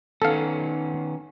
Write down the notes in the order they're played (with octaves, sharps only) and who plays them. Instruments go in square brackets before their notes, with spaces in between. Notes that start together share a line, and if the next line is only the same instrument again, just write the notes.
[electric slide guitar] D#3 B3 C#4 [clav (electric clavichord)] A4 F5